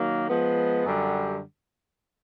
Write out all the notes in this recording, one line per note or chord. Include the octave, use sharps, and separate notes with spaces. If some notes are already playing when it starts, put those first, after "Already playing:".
Already playing: D#3 F#3 A#3
F3 G#3 B3
F#2 D3 G3